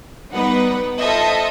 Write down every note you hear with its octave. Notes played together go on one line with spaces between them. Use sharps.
G3 B3 D#4 B4 F#5
F4 A4 C5 D#5 E5